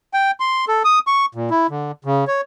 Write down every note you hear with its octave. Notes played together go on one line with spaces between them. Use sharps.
G5
C6
A4
D#6
C#6
A#2
E4
D3
C#3
C#5